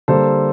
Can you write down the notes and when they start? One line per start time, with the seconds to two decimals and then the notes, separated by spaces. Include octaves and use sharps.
0.08 D3 G3 A#3 A4 C5